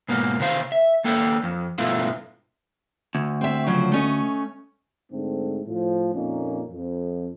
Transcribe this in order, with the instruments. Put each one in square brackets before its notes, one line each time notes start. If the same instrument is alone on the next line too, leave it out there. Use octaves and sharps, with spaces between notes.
[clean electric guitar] G#2 B2 A#3
C3 D#3 C5 F5
E5
D#2 A#3 A4 G5
F2
G2 B2 A3 E4 F4
[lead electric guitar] D2
[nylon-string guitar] C4 E5
C#3 F3 F#3
A3 C#4 D#5
[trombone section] G#2 D3 A3 C4
A2 F3
F2 A#2 A#3 C#4 D#4
F2